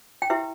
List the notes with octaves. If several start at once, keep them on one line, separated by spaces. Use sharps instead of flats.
G5
E4 G4 B4 E5